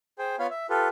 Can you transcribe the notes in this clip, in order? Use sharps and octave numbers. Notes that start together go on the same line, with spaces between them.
G#4 C5 G5
B3 F4 C#5 F5 B5
E5
F4 G4 A4 B4